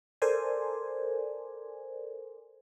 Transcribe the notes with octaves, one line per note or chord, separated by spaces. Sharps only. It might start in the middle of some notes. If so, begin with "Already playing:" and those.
A4 A#4 C5 D5 G#5